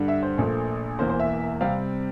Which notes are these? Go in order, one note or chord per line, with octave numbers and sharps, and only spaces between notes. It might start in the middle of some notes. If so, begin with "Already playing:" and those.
Already playing: G2 D3 G3
E5
C5
A#1 A#2 A3
E1 E2 E3 A#3 C5
C5
E5
C3 G3 C4 F5